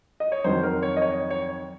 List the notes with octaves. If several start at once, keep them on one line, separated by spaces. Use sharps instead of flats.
D#5
C#5
F2 D#3 F#3 C5
A#4
C#5
D#5
C#5
C#5